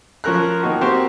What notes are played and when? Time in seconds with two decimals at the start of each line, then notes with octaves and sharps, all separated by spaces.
0.24 F3 C#4 A#4 A#5 F#6
0.63 D#3 A#3 D#4 F#4
0.81 C4 F#4 G4 A#4 C5